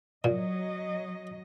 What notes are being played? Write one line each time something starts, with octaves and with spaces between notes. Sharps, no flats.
A#2 F#3 D#5